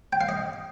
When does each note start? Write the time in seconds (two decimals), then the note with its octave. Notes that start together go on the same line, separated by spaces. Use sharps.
0.13 G5
0.21 F5
0.29 D#5